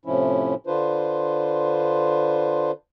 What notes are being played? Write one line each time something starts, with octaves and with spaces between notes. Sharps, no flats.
A2 C3 F3 C#4 E4
D3 D4 F4 B4 C5